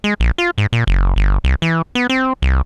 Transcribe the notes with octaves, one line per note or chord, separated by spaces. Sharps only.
G#3
A#1
F4
G#2
A#2
F#1
G1
C2
E3
B3
C4
C2